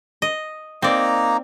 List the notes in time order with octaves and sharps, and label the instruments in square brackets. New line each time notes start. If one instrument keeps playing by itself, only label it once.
[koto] D#5
[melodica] A#3 D#4 A#5 [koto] C4 D5